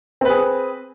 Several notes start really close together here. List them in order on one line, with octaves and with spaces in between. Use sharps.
C4 B4 G#4